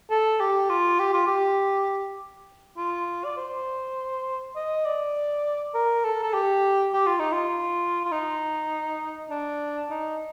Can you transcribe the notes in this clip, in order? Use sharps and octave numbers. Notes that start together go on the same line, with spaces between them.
A4
G4
F4
G4
F4
G4
F4
D5
C5
D#5
D5
A#4
A4
A4
G4
G4
F4
D#4
F4
F4
D#4
D4
D#4